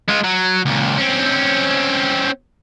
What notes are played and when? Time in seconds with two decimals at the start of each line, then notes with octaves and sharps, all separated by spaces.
0.08 G#3 F4
0.24 F#3
0.66 C#2 A#2
0.98 C4 C#4